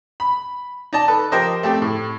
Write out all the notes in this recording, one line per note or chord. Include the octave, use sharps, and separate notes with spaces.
B5
D#4 D5 A5
A4 B4
F3 G4 A#4 C5 D#5
A3 C4 G4
A2